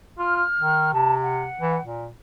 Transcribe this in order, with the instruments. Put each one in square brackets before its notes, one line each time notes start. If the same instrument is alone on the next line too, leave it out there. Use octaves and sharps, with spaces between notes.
[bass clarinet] F4 [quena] F6
[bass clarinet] D#3
[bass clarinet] C3 [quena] A5
[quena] F#5
[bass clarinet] E3
A#2